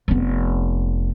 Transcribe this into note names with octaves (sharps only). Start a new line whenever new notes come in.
F1 B3